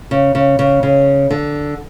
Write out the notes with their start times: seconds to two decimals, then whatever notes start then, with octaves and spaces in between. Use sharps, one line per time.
0.11 C#3
0.35 C#3
0.59 C#3
0.83 C#3
1.30 D3